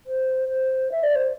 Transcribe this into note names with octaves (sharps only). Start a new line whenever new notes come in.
C5
C5
E5
D5
C5